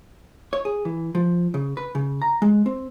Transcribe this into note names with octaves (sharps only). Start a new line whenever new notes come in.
C#5
G#4
E3
F3
C#3
B4
C#3
A#5
G#3
C4